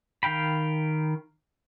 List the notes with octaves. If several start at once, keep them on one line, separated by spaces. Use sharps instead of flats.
D#3 F5 G5 B5